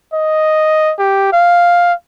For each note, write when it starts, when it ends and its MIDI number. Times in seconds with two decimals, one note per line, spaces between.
0.14 0.93 75
0.99 1.32 67
1.33 1.93 77